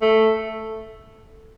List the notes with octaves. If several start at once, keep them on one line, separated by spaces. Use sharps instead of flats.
A3